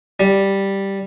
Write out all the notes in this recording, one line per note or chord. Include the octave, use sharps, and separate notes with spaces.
G3